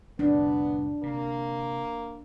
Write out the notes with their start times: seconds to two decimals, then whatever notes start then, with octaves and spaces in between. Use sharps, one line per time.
0.19 C2 F2 A2 B3 D4
1.03 C3 A#3